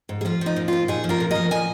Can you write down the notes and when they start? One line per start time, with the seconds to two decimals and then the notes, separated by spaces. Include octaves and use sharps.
0.09 G#2
0.21 G#4
0.25 F3 F4
0.41 F3 D#4
0.56 A#2
0.68 A#2 F4
0.88 A#2 D#4 G#4
1.04 F3
1.09 F4 A#4
1.20 A#2
1.31 F3 A#4 D#5
1.51 A#2 D#5 G#5